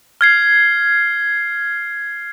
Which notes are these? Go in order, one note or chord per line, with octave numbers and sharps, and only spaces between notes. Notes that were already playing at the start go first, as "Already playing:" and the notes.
F6 G#6 C7